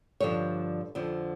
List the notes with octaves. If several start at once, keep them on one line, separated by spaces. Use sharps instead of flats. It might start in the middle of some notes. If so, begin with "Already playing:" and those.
G2 D3 F3 C#5
F2 D3 F3